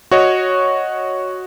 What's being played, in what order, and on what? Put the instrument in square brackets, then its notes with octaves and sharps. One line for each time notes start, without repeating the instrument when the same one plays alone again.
[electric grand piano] F#4 C#5 D#5